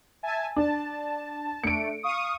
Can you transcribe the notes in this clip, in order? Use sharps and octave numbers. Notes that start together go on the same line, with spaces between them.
E5 G#5 A5
D4 A5
A3 D4 C#7 D7
F5 C#6 D#6